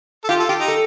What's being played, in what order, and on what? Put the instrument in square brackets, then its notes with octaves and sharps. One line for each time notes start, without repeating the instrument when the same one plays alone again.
[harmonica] A4
[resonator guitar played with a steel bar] F4 [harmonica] G4
[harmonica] A4
[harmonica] F4 [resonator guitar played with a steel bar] G4
[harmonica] D#4
[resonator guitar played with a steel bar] A4